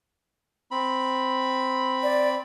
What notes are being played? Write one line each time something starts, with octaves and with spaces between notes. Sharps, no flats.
C4 B5
D5